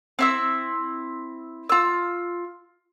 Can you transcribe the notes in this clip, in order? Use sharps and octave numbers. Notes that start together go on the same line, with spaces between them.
C4 E4 E6
F4 E6